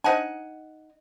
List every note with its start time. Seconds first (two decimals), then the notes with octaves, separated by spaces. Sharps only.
0.04 D4 D#4 C5 F#5 G#5